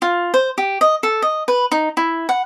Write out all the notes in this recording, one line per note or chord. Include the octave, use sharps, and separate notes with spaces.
F4
C5
G4
D#5
A4
D#5
B4
D#4
E4
F#5